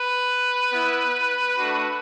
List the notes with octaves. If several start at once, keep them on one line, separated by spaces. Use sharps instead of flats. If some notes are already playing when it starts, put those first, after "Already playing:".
Already playing: B4
B3 E4
A3 D4 F#4